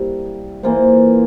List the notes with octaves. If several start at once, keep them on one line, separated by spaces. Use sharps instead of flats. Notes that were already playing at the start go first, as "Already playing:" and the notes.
Already playing: C3 G3 A#3 E4
E3 A#3 F4 C5